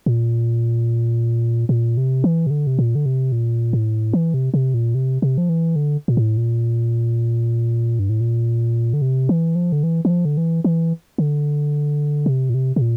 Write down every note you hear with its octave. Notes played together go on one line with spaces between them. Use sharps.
A#2
A#2
C3
E3
C3
D3
C3
A#2
D3
C3
A#2
A2
E3
C3
C3
A#2
C3
C3
F3
E3
D3
A#2
A2
A#2
G2
A2
A#2
D3
C3
E3
F3
D3
E3
E3
F3
D3
E3
E3
D3
C3
A#2
C3
C3
A#2